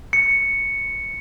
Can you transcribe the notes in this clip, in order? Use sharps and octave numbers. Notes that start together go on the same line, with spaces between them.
C#7